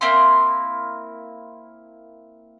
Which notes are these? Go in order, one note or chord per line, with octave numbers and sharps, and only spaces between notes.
A#3 C4 E4 C6